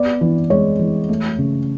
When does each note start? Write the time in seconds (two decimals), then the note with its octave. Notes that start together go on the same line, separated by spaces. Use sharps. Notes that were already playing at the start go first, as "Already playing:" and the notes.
Already playing: B3 D5
0.21 E3
0.50 G#3 C#5
0.79 E3
1.09 A3
1.38 C#3